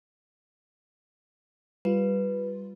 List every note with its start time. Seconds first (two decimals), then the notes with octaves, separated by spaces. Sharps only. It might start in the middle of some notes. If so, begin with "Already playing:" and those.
1.85 G3 F4 B4